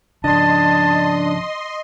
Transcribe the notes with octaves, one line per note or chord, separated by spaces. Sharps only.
C#3 F3 D4 D#5 A5 C6